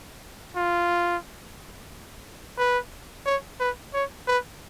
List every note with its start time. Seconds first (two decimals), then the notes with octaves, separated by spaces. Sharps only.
0.56 F4
2.58 B4
3.26 C#5
3.60 B4
3.94 C#5
4.27 B4